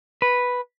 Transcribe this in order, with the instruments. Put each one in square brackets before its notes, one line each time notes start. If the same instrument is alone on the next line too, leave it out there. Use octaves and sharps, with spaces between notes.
[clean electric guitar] B4